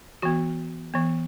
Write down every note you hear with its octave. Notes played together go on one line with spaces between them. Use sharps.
E3 B3 F#4
E3 B3